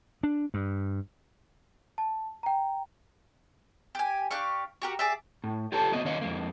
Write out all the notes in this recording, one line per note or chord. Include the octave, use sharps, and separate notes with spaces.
D4
G2
A5
G5 A#5
G4 G#5
D4 G4 F5 C#6
F#4 G4 A#4
G#4 D5 E5
A2
F4 G4 A4 C#5 A5
F#3 A#3 B3 D#5
D#3 C#4 C#5 D#5 F5
F2 G#3 A#3